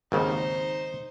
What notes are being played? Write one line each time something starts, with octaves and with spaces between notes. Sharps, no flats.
G#1 D#2 C#3 D#4 C5